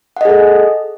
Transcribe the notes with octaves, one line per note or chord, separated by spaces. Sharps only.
G#4 A4 D#5 F#5